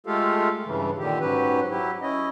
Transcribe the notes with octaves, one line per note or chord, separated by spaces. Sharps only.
G#3 A3 F4 G4 A4 F5
G2 C#3 E3
A#2 D3 D#3 G4
G#2 F#3 C#4 G4 B4
F#3 E4 G4
C#4 E4 D#5